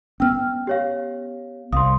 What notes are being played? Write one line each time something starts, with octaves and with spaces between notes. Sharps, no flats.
B3 C#4 G5 E6 F6
G4 C#5 F5
C2 F5 C6 D#6